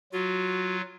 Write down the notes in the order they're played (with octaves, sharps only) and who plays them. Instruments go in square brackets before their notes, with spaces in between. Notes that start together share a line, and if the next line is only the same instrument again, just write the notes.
[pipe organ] F#3 F4 [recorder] F#4